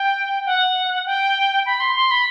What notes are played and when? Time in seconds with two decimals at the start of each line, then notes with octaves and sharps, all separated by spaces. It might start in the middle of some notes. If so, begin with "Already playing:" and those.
Already playing: G5
0.46 F#5
1.06 G5
1.66 B5
1.80 C6
1.95 C6
2.11 B5